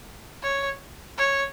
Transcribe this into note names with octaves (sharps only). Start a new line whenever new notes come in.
C#5
C#5